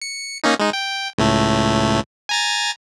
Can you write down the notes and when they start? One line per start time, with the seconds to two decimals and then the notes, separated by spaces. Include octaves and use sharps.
0.02 C#7
0.44 A#3 C#4 D#4
0.59 G#3 D#4
0.73 G5
1.18 C#2 A2 A3
2.29 G#5 A#5 A6